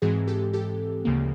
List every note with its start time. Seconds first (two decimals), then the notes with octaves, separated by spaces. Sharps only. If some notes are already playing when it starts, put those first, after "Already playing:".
0.02 G#2 E3 G#3 C4 F#4 G#4
0.27 G4 A4
0.53 G4 A4
1.05 D2 C#3 F3 A#3